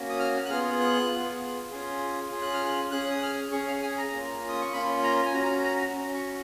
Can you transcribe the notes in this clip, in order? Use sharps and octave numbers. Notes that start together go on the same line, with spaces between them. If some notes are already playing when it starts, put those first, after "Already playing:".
Already playing: A#3 C#4 F#4
D#6
F6
F#6
B3 F4 G#4 F6
F#6
B3 F4 G#4
C#4 F4 G#4
C#4 F4 G#4
F#6
F6
F#6
C#4 G#4 F#6
D#6
F6
C#4 G#4 C#6
F5
G#5
A#5
A#3 C#4 F4
D#6
C#6
A#3 C#4 F4 B5
A#5
G#5
C#4 F#4 A#5
A#5
C#4 F#4
C#6